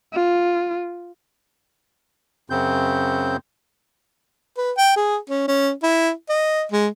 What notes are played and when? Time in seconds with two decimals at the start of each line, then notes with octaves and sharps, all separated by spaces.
0.13 F4
2.50 F#2 C#3 C4 G6
4.57 B4
4.77 G5
4.96 G#4
5.29 C#4
5.47 C#4
5.83 E4
6.29 D#5
6.72 G#3